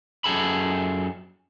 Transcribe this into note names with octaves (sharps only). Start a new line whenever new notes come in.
F#2 G#4 A4 B5